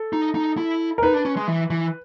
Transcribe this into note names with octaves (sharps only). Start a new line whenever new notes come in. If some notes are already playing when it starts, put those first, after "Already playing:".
Already playing: A4
D#4
D#4
E4
A#4
D#4 B4
D4
C#4
G#3
E3
E3